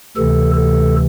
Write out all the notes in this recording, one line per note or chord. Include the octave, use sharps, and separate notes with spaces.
D2 C3 E3 A4
A4